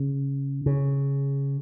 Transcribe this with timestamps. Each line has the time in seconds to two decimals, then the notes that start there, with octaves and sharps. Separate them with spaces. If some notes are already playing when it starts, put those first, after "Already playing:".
Already playing: C#3
0.66 C#3